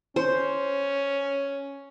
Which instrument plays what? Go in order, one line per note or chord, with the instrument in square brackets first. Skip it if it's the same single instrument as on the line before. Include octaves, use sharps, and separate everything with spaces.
[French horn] C#4 [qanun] C5